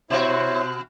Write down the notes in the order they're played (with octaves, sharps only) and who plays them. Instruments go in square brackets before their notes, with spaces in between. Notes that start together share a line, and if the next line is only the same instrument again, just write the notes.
[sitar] B2 F#4 [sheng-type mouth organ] E4 C#5 [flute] C5